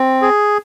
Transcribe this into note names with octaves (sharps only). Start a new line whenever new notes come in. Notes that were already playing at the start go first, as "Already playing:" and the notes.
Already playing: C4
G#4